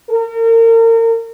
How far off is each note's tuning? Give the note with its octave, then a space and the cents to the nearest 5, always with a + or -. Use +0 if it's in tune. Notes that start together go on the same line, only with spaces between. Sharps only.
A#4 -35